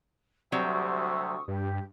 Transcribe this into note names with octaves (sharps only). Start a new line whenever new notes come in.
D2 C3 F#3 G3 C4 C#6 D#6 E6
G2 G4